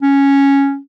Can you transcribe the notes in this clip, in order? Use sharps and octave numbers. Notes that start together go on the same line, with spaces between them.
C#4